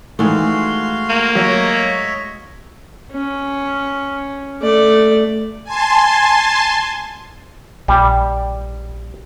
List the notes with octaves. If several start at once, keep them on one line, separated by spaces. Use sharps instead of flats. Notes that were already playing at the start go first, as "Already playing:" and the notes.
D#3 E3 G#3 A3 F#4 F5 C6
A#3
F#3 F#4 C#5 D#5 E5
C#4
A3 D5
G#5 A5 C6
A#1 G3